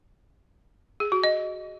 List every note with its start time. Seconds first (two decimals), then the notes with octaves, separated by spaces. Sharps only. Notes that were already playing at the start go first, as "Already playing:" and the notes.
1.00 G#4
1.12 F#4
1.24 D#5